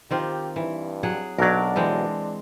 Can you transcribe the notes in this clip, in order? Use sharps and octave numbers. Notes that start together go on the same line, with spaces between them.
D#3 C4 F4 G4
G2 E3
F#3 G#4 F#5
B1 F#3 D4 A#4 D5
E3 G#3 C4